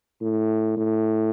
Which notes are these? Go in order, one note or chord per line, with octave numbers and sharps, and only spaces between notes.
A2
A2